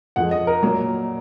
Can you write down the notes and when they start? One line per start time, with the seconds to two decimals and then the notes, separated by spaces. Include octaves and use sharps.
0.16 F2 F3 G#3 F#5
0.31 D#5
0.47 A#4
0.63 A#2 F#3 A#3